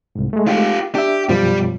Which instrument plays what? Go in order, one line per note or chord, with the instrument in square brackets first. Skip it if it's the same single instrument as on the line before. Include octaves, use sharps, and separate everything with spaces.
[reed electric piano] C2 G#2
G#3 A3
[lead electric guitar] F4 G4
[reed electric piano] D4 E5 [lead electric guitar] G4
[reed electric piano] F#2 B2 F3 [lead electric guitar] G3